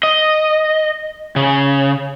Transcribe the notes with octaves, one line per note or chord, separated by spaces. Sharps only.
D#5
C#3